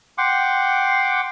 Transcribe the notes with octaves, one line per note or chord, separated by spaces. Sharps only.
F#5 G5 C6 D6